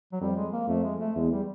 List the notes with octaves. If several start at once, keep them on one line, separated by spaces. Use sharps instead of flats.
F#3
F2 G3
G#3
A#3
F2 A3
G#3
A3
E2 G#3
G3